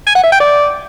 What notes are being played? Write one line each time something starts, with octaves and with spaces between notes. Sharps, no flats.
G#5
F#5
E5
G5
D5